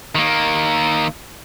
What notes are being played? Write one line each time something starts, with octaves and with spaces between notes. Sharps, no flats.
D#3 A#3